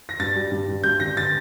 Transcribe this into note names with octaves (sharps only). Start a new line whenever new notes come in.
A#6
G2 A6
G3
G2
G2
G2 G6
D3 A#6
A6